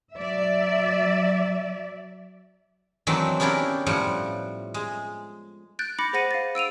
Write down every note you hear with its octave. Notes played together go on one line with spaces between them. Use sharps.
F#3 D5 E5
D#3 E3 F#3 A3 C4 D4
B3 C#4 D4 E4 G4 A#4
A2 F3 G3 F#5
G#3
F#6 G6 A6 D7
B5 D6 A6 A#6 C#7
G#4 C5 F#5 A#6 C#7 D#7
F5 A6
E6 D7 D#7 F7